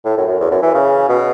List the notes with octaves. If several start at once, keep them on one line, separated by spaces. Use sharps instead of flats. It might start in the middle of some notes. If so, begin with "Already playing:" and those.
A2
F#2
F#2
E2
F#2
E3
C#3
B2